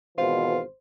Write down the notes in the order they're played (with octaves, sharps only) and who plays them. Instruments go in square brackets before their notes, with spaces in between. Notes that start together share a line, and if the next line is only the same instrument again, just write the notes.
[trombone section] G#1 B2 E3 [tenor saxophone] F4 [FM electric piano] C5